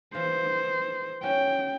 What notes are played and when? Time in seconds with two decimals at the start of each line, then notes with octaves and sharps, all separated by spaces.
0.14 E3 C5 F5
1.23 C#4 F#4 G5